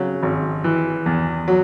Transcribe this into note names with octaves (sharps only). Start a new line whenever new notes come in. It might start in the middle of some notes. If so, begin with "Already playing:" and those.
Already playing: C#3 F#3
G#1
E3
E2
F#3